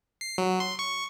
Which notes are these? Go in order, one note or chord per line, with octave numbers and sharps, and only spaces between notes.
C7
F#3
C6
C#6